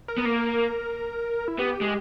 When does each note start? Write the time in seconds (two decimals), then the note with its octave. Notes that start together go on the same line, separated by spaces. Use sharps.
0.08 A#4
0.18 B3
0.25 A#3
1.48 E4
1.59 B3 G4
1.81 G#3